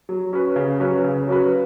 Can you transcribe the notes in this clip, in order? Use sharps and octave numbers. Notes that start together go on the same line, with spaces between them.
F#3
C#4 F#4 B4
C#3
F#3 C#4 F#4 B4
C#3
F#3 C#4 F#4 B4